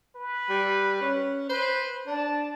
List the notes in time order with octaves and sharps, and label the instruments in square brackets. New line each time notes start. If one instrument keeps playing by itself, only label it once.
[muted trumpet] B4
[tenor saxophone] G3
C#4
[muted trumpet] B4 [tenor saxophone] C5
[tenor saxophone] D4 [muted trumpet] A5